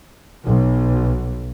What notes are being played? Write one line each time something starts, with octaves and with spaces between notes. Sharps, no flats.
B1